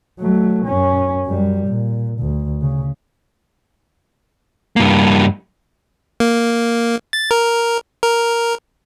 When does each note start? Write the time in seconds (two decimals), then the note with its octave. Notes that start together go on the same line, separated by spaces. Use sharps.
0.20 F#3 A3
0.65 F#2 C#4
1.26 F#2 G3
1.67 A#2
2.20 D2
2.62 C#3
4.76 G2 A#3
6.20 A#3
7.13 A6
7.31 A#4
8.03 A#4